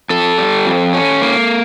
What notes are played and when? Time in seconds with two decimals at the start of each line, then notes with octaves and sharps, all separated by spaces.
0.10 F2 A4
0.38 G3
0.66 F2
0.93 C#4
1.22 A#3